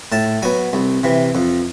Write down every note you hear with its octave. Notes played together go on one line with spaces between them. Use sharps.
A2 A5
F#3 B3 G#5
C2
C3 E3
F2